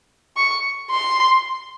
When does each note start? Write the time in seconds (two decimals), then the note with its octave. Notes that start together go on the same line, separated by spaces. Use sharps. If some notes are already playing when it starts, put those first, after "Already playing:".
0.37 C#6
0.90 C6